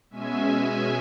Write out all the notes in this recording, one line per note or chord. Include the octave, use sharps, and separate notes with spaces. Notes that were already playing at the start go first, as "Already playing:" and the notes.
B2 G#3 C#4 E5 G#5